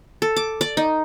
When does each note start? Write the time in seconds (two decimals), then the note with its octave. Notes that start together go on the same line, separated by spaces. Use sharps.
0.22 A4
0.36 D6
0.61 D5
0.77 D#4